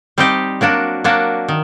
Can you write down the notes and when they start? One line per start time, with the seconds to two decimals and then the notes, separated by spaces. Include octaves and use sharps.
0.18 G3 C4 D#4 G4
0.61 F#3 A#3 D4 F#4
1.04 F#3 A#3 D4 F#4
1.49 D#3